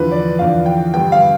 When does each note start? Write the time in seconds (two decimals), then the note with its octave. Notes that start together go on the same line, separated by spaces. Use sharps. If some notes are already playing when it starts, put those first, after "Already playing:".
Already playing: E2 D3 F3 B4
0.12 D5
0.39 E2 D3 F3 F5
0.66 G5
0.94 G2 D3 G3 B3 G5
1.12 F5